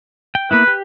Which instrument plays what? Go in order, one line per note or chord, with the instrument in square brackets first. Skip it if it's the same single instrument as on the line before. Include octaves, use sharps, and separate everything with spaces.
[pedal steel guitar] G5
[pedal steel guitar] A#3 B3 E4 [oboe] B4
[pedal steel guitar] G4